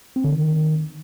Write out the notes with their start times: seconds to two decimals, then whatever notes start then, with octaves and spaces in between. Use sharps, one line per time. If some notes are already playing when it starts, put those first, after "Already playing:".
0.16 C4
0.24 D3
0.32 D#3